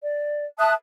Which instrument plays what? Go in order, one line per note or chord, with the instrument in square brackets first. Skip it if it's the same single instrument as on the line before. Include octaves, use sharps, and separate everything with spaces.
[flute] D5
[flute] E5 [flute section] A5 D#6 F#6